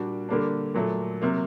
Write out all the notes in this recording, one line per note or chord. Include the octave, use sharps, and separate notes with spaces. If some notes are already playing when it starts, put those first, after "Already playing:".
Already playing: A#2 G3 D4 F#4
D3 G3 A#3 D4
A#2 F#3 A3
C3 F#3 A#3